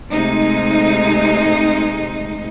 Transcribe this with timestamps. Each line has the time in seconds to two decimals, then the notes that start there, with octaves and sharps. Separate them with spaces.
0.11 C3 G#3 A3 D#4